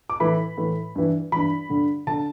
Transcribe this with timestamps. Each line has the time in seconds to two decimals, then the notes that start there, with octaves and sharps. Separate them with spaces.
0.10 D6
0.20 A2 E3 B5
0.57 A2 E3
0.95 G2 E3
1.32 G2 E3 B5
1.69 G2 D3
2.07 D3 A5